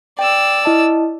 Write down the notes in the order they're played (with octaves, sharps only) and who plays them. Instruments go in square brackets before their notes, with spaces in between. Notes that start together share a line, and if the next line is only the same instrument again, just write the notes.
[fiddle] D5 E6 [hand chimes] G5
[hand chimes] E4 D#5 A5